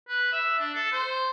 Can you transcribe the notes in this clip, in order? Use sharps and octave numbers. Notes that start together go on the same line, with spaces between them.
B4
E5
D4
A4
C5